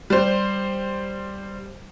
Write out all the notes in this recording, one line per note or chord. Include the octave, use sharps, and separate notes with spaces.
G3 C5